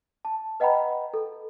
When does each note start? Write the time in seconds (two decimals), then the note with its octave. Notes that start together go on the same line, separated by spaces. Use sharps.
0.25 A5
0.60 B4 D#5 F#5 G5 A#5 B5
1.14 A4